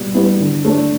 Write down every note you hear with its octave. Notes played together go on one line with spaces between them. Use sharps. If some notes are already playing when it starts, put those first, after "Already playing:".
Already playing: B2 G3 B3
G3 B3 E4
D3
A3 D4